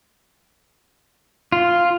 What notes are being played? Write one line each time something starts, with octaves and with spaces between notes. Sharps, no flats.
F4